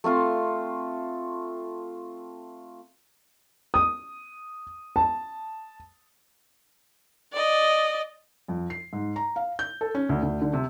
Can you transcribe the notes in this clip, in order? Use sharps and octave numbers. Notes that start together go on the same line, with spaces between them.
A3 C4 F4 A4
D#6
A5
D5 D#5
F2
C7
G#2
A#5
F5
G6
A4
C#4
D2
D2
D3
C3